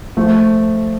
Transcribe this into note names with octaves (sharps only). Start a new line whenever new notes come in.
F3 A3